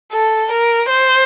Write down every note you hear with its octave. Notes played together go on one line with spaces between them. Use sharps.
A4
A#4
C5